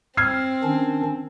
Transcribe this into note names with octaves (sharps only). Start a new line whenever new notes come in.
C4 F6 G#6 C7
D#3 C#4 D4